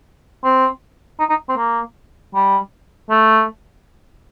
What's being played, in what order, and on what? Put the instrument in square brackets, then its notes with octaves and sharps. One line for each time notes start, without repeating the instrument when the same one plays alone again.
[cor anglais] C4
D#4
D#4
C4
A#3
G3
A3